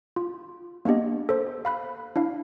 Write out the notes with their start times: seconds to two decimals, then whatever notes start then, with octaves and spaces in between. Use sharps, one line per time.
0.16 F4
0.85 A#3 B3 D4 G4 D#5
1.29 A4 C5
1.65 F5 B5 F#6
2.16 D4 E4 F5